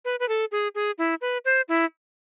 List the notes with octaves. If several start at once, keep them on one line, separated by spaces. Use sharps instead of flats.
B4
B4
A4
G#4
G#4
E4
B4
C5
E4